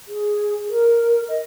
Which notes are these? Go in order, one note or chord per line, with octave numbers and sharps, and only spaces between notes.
G#4
A#4
D#5